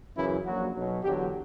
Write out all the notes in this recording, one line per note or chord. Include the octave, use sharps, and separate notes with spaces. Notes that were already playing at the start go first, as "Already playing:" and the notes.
F#2 C#3 E3 E4
A#1 A#2 F#3 F#4
B1 B2 F#3
E2 D3 F#3 G4